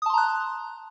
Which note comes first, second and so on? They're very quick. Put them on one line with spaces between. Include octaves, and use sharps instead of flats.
D#6 A5 C6 A#5 F#6